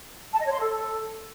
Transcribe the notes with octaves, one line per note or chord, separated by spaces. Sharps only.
A5
D#5
C#5
C6
A4